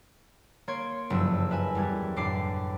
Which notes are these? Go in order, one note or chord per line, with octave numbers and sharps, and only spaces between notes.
A#3 C#5 C6 G#6 D7
F#1 G2 F3 E6
A#4 B4 E5 G#5
E2 G3 G#6
A1 F#2 D4 D6 C7